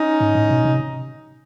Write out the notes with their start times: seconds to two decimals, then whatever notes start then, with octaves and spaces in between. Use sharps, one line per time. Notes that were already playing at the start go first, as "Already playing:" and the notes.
Already playing: C#4 D#4
0.21 G#2
0.35 A2
0.50 B2
0.65 C3